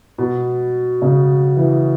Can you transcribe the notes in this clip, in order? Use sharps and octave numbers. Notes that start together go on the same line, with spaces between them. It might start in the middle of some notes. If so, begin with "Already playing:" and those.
B2
C#3
E3